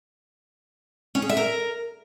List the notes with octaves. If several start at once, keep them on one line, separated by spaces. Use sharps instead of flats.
C#4
G#4
E5
A#4